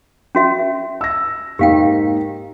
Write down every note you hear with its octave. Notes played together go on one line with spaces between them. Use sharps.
C#4 F#4 E5
E6 A#6
G#2 A#3 D#4 G4 F5 G5